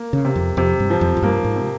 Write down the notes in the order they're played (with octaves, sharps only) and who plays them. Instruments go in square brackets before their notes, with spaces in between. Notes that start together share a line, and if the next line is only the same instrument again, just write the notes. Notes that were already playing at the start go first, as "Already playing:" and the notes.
Already playing: [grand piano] A#3
[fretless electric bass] C#3
[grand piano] C3
[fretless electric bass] F2
[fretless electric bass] F2 [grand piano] C3
[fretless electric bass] G2
[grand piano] F3
[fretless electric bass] F2
F2
[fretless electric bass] G2 [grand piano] A#3
[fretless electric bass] G#2
[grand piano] C3